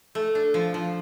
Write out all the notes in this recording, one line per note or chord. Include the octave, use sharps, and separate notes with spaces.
A3
D4
F3
F3